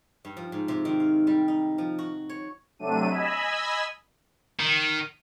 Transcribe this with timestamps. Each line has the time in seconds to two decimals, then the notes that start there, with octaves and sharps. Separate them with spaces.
0.25 G2
0.37 F3
0.52 G#2
0.68 C3
0.85 D#3
1.00 F5
1.27 G3
1.48 D#4
1.78 F3
1.99 F#4
2.29 C#5
2.79 C3 F#3 A3 D4 D#7
3.09 D#5 G#5 B5 E6
4.59 D#3